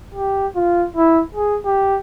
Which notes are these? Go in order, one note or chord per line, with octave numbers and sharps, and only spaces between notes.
G4
F4
E4
G#4
G4